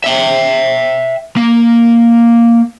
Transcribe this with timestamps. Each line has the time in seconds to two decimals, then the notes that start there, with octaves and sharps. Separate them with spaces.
0.04 E5 G5
1.36 A#3